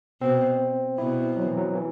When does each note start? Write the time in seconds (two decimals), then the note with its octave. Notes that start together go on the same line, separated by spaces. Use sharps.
0.21 B2 C4
0.98 B2 E4
1.37 F#3
1.46 E3
1.57 F#3
1.75 E3